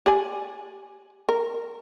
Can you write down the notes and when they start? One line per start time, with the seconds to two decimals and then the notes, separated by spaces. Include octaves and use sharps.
0.06 G4 D5 G#5
1.29 A#4